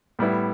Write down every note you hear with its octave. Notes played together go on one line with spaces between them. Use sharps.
A2 G3 B3 E4